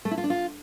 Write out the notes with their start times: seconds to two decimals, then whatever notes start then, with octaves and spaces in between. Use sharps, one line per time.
0.05 A3
0.11 E4
0.18 F4
0.24 D4
0.30 F4